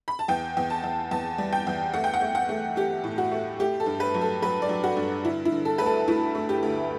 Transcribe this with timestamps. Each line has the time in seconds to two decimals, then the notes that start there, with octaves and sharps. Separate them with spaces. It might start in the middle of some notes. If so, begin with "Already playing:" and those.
0.08 B5
0.19 A5
0.28 E2 G5
0.57 E2
0.70 A5
0.84 E2
1.11 E2 A5
1.38 G3
1.53 G5
1.67 E2
1.94 A3 F#5
2.04 G5
2.14 F#5
2.21 A3
2.35 F#5
2.49 A3
2.76 A3 G4
3.04 A2
3.18 F#4
3.31 A3
3.59 A3 G4
3.80 A4
3.86 G2
4.00 B4
4.14 F#3
4.21 A4
4.42 F#3 B4
4.62 D5
4.69 F#3
4.84 F#4
4.97 G2
5.25 D3 E4
5.45 E4
5.52 D3
5.65 A4
5.78 D2 B4
5.86 A4
6.08 A3 E4
6.35 A3
6.49 G4
6.63 D2